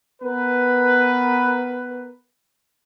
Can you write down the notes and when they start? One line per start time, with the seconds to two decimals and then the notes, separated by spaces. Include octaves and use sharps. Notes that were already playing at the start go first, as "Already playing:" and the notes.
0.22 B3 A#4 B4